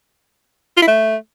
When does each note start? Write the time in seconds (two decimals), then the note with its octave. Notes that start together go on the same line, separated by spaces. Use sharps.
0.77 F4
0.82 E4
0.87 A3